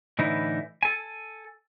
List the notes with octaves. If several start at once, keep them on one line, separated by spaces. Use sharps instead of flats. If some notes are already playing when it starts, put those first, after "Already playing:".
A2 D3 E3 D#4 E4
A4 G#5